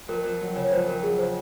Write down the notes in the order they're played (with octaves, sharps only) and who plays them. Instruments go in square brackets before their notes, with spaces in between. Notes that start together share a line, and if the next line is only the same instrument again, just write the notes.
[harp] F2 [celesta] A#4
[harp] F2
F#3
C#3
[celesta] C#5
[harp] F2 [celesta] C5
[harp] F2 [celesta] A#4
[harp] F#3 [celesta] G#4
[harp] C#3 [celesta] C5